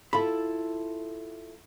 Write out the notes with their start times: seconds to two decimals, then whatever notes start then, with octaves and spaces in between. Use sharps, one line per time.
0.13 E4 F4 A4 B5